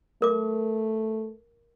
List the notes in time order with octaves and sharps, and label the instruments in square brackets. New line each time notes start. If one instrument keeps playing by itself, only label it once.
[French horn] A3 [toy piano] A#4 D6